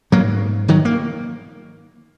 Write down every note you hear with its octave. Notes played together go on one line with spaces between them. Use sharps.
G#2 F#3 A#3
D#3 F#3
A#3